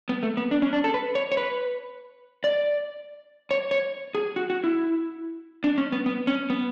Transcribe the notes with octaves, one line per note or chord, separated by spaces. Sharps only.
B3
A3
B3
D4
C#4
D4
A4
B4
C#5
C#5
B4
D5
C#5
C#5
G#4
F#4
F#4
E4
D4
C#4
B3
B3
C#4
B3